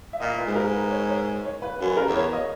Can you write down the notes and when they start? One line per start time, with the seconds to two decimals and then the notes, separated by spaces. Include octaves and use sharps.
0.13 E5
0.20 A#2 D#5
0.39 B4
0.47 G#2
0.55 A#4
0.73 B4
0.91 C#5
1.09 C#5
1.45 C#5
1.62 B4
1.80 F#2 B4
1.97 A#4
2.07 E2
2.15 C#5
2.33 D#5